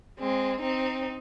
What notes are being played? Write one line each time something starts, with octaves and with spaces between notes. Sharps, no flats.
G#3 C4
C4 D#4